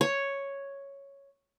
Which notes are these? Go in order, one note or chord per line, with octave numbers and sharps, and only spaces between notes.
C#5